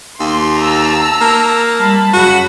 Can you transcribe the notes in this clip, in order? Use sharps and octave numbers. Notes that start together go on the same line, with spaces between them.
D#2 C6
A5 A#5 E6
A#3
G3 A5 B5
F#2 C#3 F#4 B5